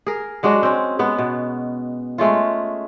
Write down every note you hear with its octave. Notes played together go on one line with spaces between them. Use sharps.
G#4 A#4
F#3 G#3 D4 F#4
C4 C#4
G#3 B3 F#5
B2
G#3 A3 C#4 F4